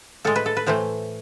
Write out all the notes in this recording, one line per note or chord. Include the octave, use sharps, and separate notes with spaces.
A2 G#3 A4
B4
A4
B4
A2 E3 A3 C5